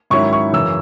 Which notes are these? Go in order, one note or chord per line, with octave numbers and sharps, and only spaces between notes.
G#2 D#3 F#3 C#4 E4 C#6
C#6
F#2 C#3 E3 E6